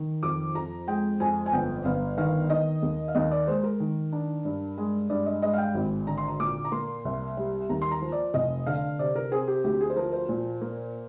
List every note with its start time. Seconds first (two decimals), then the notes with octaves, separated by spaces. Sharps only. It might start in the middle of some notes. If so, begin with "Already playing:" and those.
Already playing: D#3
0.23 F2 D6
0.55 F2 A#5
0.87 G#3 G5
1.20 F2 G#5
1.46 G#5
1.52 G1 G5
1.85 G1 F5
2.18 D#3 F5
2.50 D#3 D#5
2.83 D#2
3.08 F5
3.15 D#2 D#5
3.31 D5
3.47 G#3 C5
3.64 A#4
3.80 D#3
4.13 D4
4.45 G2
4.78 G#3
5.10 G2 D5
5.26 D#5
5.42 G#3 D#5
5.53 F5
5.58 G5
5.75 G#1
6.07 D3 A#5
6.18 C6
6.28 A#5
6.40 A#2 D6
6.65 A#5
6.72 A#3 C6
7.05 C2
7.37 G3
7.69 D#2 A#5
7.82 C6
7.91 A#5
8.02 F3
8.12 D5
8.34 F1 D#5
8.66 D3 F5
8.99 C3 D5
9.16 A#4
9.32 C4 G#4
9.48 G4
9.64 D2 G4
9.81 G#4
9.90 C5
9.96 F3 A#4
10.13 C5
10.29 A#2
10.61 A#3